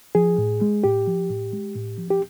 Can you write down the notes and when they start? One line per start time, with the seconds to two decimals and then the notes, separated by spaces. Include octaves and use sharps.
0.15 F3 G#4
0.38 A2
0.61 G#3
0.84 A2 G4
1.07 F3
1.30 A2
1.53 G#3
1.75 A2
1.98 F3
2.10 G4